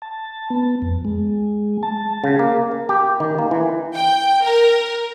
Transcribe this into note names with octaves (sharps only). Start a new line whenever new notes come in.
A5
B3
F2
G#3
A5
C#3
A#3
A#4
G4
D#3
A#3
E3
G5
A#4